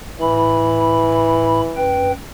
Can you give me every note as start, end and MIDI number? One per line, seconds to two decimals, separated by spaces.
0.21 1.61 45
0.21 1.90 52
0.21 1.61 83
1.76 2.12 42
1.76 2.12 71
1.76 2.12 79